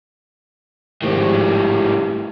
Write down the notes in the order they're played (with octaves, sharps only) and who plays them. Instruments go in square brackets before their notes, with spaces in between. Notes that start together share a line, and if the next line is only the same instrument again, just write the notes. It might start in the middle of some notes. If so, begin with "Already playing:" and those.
[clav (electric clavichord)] G#1 D#3 F3 [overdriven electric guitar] A2 G3